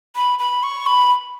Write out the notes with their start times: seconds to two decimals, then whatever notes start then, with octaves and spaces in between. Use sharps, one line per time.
0.16 B5
0.39 B5
0.63 C#6
0.86 B5